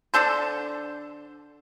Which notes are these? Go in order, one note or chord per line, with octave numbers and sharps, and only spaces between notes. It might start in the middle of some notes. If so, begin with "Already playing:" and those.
D3 D4 A4 C5